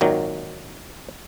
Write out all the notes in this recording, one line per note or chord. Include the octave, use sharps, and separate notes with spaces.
G#1 A#2 D#3 F#3